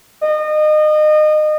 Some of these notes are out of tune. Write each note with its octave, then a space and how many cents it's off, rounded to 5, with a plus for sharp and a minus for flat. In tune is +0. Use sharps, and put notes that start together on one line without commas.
D#5 -30